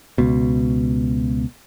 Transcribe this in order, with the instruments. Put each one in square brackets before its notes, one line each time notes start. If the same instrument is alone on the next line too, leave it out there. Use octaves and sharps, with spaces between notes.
[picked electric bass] C#2 B2